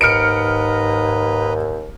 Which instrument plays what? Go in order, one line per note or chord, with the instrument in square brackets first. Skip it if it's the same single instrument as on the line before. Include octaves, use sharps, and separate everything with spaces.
[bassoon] D#2 [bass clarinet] G#2 [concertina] B4 D#5 A#5 [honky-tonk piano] F6 C#7 D7